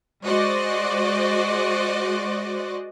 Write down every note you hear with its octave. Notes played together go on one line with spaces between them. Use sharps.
G#3 F#4 C5 D5 D#5